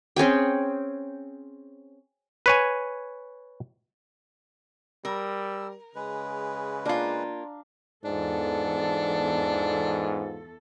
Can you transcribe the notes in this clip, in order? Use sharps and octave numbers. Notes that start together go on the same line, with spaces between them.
C4 C#4 G#4 G5
B4 C#5 G#5
G3 A#4 E6
C#3 G#3 B4
A#3 D4 F4 F5 A#5
E2 G#2 B3 D4 F4 A4